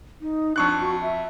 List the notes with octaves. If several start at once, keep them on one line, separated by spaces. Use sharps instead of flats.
D#4
F2 D4 C#6 F#6
F#4
E5